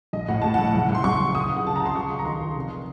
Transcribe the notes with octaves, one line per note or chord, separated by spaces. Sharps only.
A#1 D#5
A2 F#5
A2 A5
A#1 F#5
F#1
F#1
C6
F#1 C#6
F#1
C#2 D#6
C#2
F#5
C#3 A5
C#2 A#5
C6
C#2 C#6
C#2
A#5
D#3 C6
D#3
F1